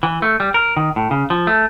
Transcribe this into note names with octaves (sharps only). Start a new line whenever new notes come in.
E3
A3
G3
A#4
D#3
A2
C#3
F3
A3